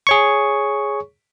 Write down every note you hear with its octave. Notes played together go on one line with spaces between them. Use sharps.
G#4 C#5 C#6